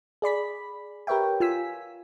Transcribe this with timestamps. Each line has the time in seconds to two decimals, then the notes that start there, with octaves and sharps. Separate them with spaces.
0.22 G#4 D5 B5 B6
1.07 G4 A#4 B4 C#5 E5 G5
1.40 F4 G#5 E6 B6